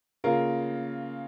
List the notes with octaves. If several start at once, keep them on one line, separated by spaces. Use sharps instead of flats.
C#3 A#3 F4 A#4